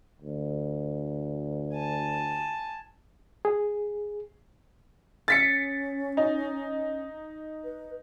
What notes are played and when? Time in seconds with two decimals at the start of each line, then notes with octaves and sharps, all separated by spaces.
0.22 D2
1.75 G#5 A5
3.45 G#4
5.28 C#4 A6 B6 C#7
6.17 D#4
7.64 B4